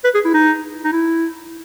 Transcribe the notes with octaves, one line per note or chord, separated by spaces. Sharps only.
B4
G#4
E4
D#4
D#4
E4